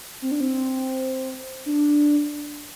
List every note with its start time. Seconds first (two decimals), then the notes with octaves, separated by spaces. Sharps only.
0.22 C4
0.31 D4
0.41 C4
1.66 D4